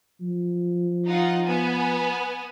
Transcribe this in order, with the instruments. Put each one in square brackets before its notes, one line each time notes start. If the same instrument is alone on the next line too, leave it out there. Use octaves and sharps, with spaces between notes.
[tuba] F3
[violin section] D#4 F4 F#5
B3 G#5